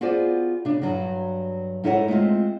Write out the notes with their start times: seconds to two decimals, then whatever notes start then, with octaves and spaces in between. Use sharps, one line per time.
0.01 B3 F4 F#4 G#4 C5 D5
0.65 C#3 D4
0.82 G2 F#3 F#4
1.84 G#2 D#4 E4 A4 C#5 F#5
2.08 G#3 A3 C4 F4